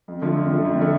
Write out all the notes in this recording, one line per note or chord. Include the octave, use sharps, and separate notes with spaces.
F2
D3 F3 A3
F2
D3 F3 A3
F2
D3 F3 A3